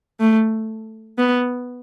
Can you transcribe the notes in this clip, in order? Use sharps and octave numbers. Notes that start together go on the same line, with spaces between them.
A3
B3